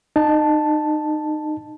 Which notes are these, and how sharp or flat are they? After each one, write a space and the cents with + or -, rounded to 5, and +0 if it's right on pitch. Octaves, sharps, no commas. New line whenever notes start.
D#4 -25 A5 +0